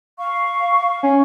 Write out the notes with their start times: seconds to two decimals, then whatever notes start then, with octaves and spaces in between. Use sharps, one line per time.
0.18 F5 C#6
1.03 C#4